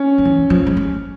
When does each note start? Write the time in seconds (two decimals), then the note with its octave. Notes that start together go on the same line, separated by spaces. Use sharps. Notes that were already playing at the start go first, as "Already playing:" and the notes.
Already playing: C#4
0.18 D#3
0.25 E3
0.50 F3
0.66 G#3
0.77 G3